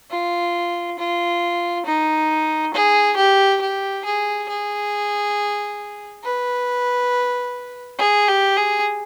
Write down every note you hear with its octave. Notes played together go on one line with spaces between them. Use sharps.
F4
F4
D#4
G#4
G4
G4
G#4
G#4
B4
G#4
G4
G#4